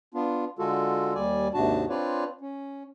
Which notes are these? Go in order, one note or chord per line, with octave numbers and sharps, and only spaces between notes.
B3 D4 F4
D3 G#3 F4 F#4 A4
D#2 G3 D5 G#5
D#2 G#2 C3 D4 F#4 A5
C4 D4 F4 B4 C#5 D5
C#4